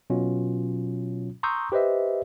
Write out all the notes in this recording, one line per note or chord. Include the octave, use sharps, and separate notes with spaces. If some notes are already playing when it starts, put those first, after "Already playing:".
B2 F#3 C#4 F4
A#5 C6 C#6 D#6 E6 G6
G4 B4 C5 D#5 E5